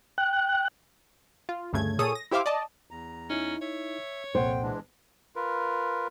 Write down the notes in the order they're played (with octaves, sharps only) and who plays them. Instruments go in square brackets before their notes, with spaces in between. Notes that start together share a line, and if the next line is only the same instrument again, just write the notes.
[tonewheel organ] G5 F#6
[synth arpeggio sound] F4
D2 G2 C#3 A3 G#6
A#2 G#4 A4 C#5 D#6 D#7
A#6
E4 G4 C5 E5 F5 D6
D5 D#5 A5
[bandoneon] E2 A#5
[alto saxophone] C#4 [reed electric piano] D#4 E4
[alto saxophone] C#5 [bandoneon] E5
[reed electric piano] C2 A#2 F#5 [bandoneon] F2 G5 [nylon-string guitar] C5
[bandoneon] E3 G#3 D4
[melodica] F4 A#4 B4